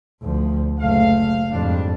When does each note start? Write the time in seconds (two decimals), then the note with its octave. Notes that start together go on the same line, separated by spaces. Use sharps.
0.22 D2 F3
0.80 F#1 A3 F5
1.52 F2 G#2 G3 D4